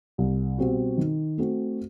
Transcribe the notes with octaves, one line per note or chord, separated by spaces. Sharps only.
C2
B2 G3 C4 F#4
D#3
A3 C4 F#4